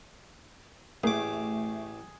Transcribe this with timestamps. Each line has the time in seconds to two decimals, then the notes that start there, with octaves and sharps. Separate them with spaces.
1.04 A1 A3 A#3 G#4 D6